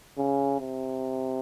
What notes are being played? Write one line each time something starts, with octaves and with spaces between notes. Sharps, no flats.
C#3
C3